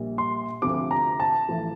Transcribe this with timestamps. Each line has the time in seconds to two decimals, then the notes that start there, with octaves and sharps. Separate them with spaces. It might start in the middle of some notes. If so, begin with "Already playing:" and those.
Already playing: A#1 A#2 G3
0.18 C6
0.62 D2 C3 F3 C4 D6
0.91 A#5
1.20 A5
1.49 A1 A2 F3